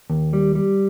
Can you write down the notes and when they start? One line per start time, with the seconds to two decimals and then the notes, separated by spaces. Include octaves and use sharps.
0.10 D#2
0.33 G3
0.55 G3